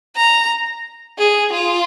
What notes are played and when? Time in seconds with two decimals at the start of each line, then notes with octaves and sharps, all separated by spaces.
0.16 A#5
1.19 G#4
1.53 F4